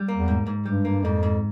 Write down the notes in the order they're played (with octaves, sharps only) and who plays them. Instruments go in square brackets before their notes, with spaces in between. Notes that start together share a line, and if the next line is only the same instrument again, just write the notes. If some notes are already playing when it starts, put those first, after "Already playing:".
Already playing: [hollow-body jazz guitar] G3
A#3
[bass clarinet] E2
[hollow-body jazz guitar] G#2
G#2
[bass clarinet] G2 [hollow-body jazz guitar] G3
[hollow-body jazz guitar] A#3
[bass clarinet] F2 [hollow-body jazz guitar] G#2
[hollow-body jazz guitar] G#2